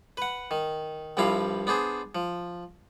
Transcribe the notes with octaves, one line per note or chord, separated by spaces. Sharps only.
B4 F#5
D#3
C2 G2 F3 G3 E4 F5
B3 D4 G#4 C5
F3